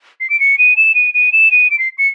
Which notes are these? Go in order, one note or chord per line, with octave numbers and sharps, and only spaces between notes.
C7
D7
C#7
D#7
E7
D#7
D#7
E7
D#7
D7
C7
C#7